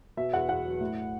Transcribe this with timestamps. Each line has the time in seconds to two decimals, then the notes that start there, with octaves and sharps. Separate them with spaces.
0.17 B2 E5
0.33 E2 F#5
0.49 E2 F#5
0.65 F#3
0.80 A2